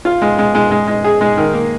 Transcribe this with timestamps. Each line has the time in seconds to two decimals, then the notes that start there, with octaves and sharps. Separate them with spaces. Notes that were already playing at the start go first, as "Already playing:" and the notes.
0.05 F4
0.22 G#3
0.39 G#3
0.55 G#3
0.71 G#3
0.87 G#3
1.04 G#4
1.21 G#3
1.37 D#3
1.53 A#3